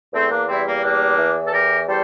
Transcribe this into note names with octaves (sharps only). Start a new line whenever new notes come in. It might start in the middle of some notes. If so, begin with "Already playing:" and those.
E2 A3 C4
A#3 D4
G3 C4 E4
A#3
E2 A#3 D4
E3
A4
E2 G4 A#4
G3 A4 C5